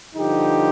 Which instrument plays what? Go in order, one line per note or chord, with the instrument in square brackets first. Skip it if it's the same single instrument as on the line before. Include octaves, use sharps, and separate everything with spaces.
[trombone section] G2 D3 F3 D#4 G4